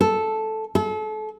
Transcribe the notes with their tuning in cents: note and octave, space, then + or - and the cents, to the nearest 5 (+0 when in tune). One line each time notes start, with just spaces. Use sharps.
A4 -5
A4 -35